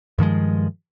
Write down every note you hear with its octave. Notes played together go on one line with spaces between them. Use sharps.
G2 D#3 F3 G#3